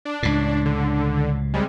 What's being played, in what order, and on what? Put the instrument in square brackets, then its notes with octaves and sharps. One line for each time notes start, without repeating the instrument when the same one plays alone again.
[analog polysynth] D4
[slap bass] C#2 A2
[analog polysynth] D3
C3 G3 G#3